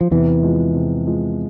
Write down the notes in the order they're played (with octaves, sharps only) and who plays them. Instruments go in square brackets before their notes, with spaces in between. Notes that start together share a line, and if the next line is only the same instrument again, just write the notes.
[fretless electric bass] F3
[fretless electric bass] E2 E3 [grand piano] C3
[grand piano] F3 G#3
C3
F3 G#3